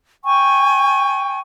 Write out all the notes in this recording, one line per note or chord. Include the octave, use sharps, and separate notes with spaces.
G5 G#5 C#6